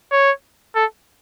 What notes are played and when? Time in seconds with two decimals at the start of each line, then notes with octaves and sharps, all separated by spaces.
0.12 C#5
0.76 A4